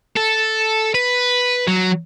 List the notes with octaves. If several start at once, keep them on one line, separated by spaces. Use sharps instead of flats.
A4
B4
F#3